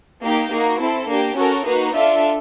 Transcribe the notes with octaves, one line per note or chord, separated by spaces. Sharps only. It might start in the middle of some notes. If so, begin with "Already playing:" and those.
A#3 D#4 G4
A#3 D#4 F#4
C4 E4 A4
A#3 D4 G4
C#4 F#4 A4 A#4
A#3 D#4 F#4 B4
D4 F4 A4 E5